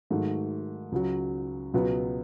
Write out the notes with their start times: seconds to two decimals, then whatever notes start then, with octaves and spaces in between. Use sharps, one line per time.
0.10 G#2 D#3 F#3 A3
0.92 C#2 C#3 F#3
1.74 C#2 B2 F#3 B3